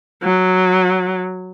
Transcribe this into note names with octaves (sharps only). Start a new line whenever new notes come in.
F#3